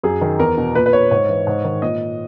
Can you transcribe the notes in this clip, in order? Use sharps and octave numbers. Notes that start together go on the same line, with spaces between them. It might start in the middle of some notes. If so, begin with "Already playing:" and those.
F#2 G#4
D#3
E2 A#4
B2
A#2 B4
B4
C#5
G#2 C#5
E3
G#2
D#3
A#2 D#5